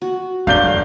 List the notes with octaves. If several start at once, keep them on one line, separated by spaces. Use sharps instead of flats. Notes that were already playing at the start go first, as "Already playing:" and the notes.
F#4
G1 E2 D5 F5 G6 G7